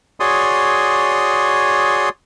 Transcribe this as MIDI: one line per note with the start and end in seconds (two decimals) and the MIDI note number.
0.20 2.09 66
0.20 2.09 68
0.20 2.09 73
0.20 2.09 74
0.20 2.09 84
0.20 2.09 87